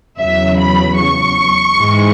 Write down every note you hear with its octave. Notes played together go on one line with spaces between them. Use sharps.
E2 C#3 F#3 E5
B5
C#6
G#2 E3 G#3